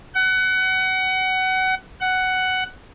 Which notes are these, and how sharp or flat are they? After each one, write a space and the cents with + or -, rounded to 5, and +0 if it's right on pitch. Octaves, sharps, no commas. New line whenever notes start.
F#5 +25
F#5 +10